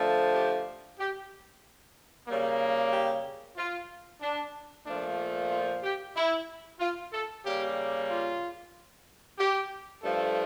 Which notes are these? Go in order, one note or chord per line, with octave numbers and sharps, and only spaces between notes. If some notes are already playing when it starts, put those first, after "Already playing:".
Already playing: D3 F3 A3
G4
G4
C#3 G3 A#3
G4
F4
D4
A#2 F3 A3 D4
F4
G4
E4
F4
A4
C#3 G3 A#3 G4
F4
G4
G2 F3 A3 A4